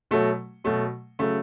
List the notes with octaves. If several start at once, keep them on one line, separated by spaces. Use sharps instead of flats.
B2 F#3 A3
B2 F#3 A3
C#3 F#3 A3